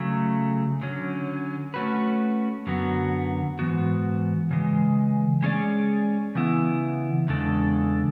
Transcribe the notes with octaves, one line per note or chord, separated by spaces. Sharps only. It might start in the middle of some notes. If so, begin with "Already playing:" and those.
Already playing: C#3 F#3 A3
D3 F#3 C#4
A3 C#4 F#4 B4
F#2 D3 F#3 B3 F#4
G#2 E3 B3 F#4
C#3 E3 G#3
G#3 C#4 G#4 D5
C#3 E3 B3 E4
E2 C#3 G#3 D4 A4